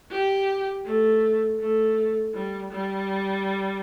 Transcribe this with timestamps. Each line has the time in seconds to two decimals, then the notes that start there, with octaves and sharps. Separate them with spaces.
0.11 G4
0.85 A3
1.60 A3
2.34 G3
2.71 G3